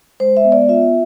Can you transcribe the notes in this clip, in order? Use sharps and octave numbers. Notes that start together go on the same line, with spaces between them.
G#3 C5
E5
B3
D5
F4 E5